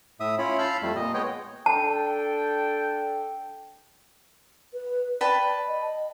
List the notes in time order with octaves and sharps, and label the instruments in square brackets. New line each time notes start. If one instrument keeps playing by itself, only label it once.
[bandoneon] A2 E5 D#6
C#4 E4 F4 C#5 B5
F5 A5 B5 E6 F6 G6
F2 G3 A3
A#2 D#5
G#3 B3 C#5 D#5 G5
[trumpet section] D4 A4 G5 [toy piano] A5
[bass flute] B4
[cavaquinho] B4 G5 A5 [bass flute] D5
[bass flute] D#5